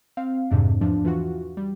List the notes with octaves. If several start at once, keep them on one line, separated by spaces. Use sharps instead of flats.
C4 F5
F2 G#2 C3 D4
E2 F3 D4
E3 F4 F#4
G3